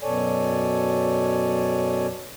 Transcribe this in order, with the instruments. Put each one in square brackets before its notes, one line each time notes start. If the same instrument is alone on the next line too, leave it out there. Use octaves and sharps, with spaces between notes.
[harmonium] F#2 B2 A4 C#5 D5 G#5